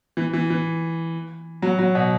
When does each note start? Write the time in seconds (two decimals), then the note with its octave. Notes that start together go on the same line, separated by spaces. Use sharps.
0.17 E3
0.33 E3
0.50 E3
1.62 F#3
1.79 F#3
1.95 B2